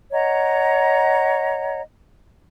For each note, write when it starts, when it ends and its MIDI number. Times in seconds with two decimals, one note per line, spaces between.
0.12 1.82 73
0.12 1.82 75
0.12 1.82 78
0.12 1.82 82